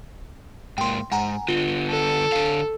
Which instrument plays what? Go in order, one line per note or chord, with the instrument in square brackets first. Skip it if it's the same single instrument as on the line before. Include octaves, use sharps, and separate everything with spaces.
[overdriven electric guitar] G#2 A#3 [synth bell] G5 C6
[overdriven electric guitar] G#2 [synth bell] F#5 G#5 A#5
[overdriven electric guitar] D3 B3 [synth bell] F4 G7
[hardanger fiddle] A4
[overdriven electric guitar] D3 F5